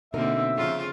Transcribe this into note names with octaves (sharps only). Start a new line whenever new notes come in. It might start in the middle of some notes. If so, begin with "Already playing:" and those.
B2 D3 A#3 C4 D#4 A#4 E5
F2 C#3 F4